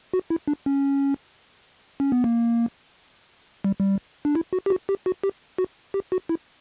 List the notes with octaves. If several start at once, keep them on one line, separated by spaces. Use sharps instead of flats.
F#4
E4
D4
C#4
C#4
B3
A#3
G3
G3
D4
E4
F#4
G4
F#4
G4
F#4
G4
F#4
G4
F#4
E4